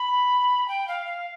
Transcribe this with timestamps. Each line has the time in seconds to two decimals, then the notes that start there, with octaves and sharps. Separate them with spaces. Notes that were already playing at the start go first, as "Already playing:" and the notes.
Already playing: B5
0.68 G5
0.88 F5
1.06 F5